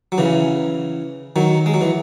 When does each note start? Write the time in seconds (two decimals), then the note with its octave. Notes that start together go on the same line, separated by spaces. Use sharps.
0.12 F#3
0.18 C#3 E3
1.36 D#3 F#3
1.66 G#3
1.74 F#3
1.81 E3